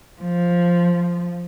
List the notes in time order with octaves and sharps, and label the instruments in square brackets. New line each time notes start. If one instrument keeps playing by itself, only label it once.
[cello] F3